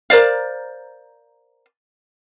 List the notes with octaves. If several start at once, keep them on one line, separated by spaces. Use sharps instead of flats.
A#4 C5 D5 F5